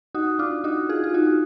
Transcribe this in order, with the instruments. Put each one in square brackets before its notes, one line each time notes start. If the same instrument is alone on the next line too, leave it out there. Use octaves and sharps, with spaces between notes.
[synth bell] D#4 F#4
D4 F4
D#4 F#4
F4 G#4
F4
D#4 F#4